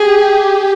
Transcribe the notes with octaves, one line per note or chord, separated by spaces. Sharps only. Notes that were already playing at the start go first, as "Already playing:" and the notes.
Already playing: G4 G#4